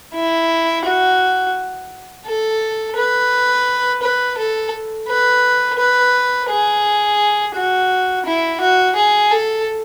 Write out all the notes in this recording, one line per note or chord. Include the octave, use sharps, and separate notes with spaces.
E4
F#4
A4
B4
B4
A4
B4
B4
G#4
F#4
E4
F#4
G#4
A4